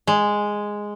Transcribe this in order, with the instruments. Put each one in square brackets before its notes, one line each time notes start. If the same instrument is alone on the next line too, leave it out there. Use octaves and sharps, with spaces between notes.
[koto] G#3